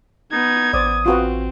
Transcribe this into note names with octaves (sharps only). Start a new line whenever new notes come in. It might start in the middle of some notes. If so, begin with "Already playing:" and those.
B3 D#4 G#6
A1 C5 D5 D#6
C4 F4 F#4 B4